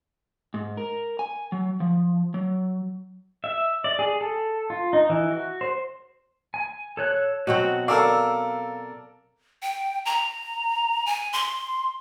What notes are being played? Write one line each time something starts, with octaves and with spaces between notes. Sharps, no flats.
G#2
A#4
G#5
F#3
F3
F#3
E5
D5
G#4
A4
F4
D#4
E3
F#4
C5
G#5
A4 C#5 F#6
B2 F#3 C4 F#4
A4 A#4 D5 F5 E6
G5
A#5
G#5
C6